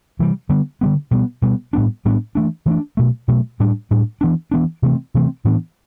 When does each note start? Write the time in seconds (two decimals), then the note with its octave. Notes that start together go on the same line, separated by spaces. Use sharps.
0.19 C3 E3 G3
0.49 D3 G3 B3
0.81 D3 G3 B3
1.11 B2 G3 B3
1.42 B2 G3 B3
1.73 A2 G3 B3 D4
2.05 A2 G3 B3 D4
2.35 E3 A3 D4
2.66 E3 A3 D4
2.97 B2 F#3 A3
3.28 B2 F#3 A3
3.60 A2 G3 D4
3.91 A2 G3 D4
4.21 E3 B3 D4
4.51 E3 B3 D4
4.82 C3 E3 A3 C4
5.14 C3 E3 A3 C4
5.45 A2 E3 B3 D4